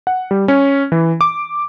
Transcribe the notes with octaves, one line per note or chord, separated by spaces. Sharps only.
F#5
G3
C#4
E3
D6